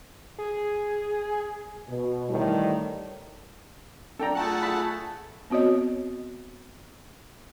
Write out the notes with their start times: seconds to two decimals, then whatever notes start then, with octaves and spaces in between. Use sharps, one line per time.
0.39 G#4
1.89 B2
2.29 A2 D#3 E3 G3
4.19 D4 A4 D5 G5 A#5
4.35 A3 F4 G#4 F#5 A5
4.63 F4 B5
5.50 B3 C4 F#4 C#5 D#5